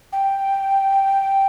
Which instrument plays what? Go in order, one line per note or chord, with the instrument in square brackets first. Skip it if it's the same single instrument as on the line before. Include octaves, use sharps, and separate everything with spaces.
[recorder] G5